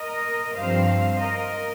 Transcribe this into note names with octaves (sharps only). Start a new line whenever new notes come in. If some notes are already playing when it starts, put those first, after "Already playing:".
Already playing: A#4 D#5
G2 F3 C4 C5 F5
A#4 D#5